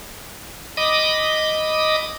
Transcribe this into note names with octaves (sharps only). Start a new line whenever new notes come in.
D#5 B5 D6 D#6